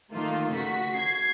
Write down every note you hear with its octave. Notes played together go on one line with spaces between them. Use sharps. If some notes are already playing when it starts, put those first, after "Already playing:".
D#3 A3 A#3 F4
C#3 F#4 B6
G#6 C7